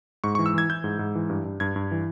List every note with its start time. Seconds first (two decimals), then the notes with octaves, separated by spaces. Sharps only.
0.24 G#2 C#6
0.35 E3 C#6
0.46 E6
0.54 E3 G#6
0.69 E3 G6
0.84 G#2
0.99 G#2
1.15 E3
1.30 G2
1.45 G2
1.60 G2 G#6
1.76 G2
1.92 E3